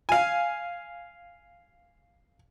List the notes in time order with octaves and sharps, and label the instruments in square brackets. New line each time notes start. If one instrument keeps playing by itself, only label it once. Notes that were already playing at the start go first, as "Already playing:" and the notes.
[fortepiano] F5 G#5